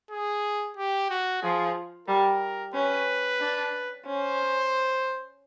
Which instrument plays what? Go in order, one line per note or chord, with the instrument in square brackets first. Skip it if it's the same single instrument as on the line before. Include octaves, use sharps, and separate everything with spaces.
[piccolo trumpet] G#4
G4
F#4
[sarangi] F3 [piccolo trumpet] G#4
[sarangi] G3 [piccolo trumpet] A#4
[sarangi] C#4 [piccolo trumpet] B4
[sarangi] D4
[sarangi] C#4 [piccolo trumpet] C5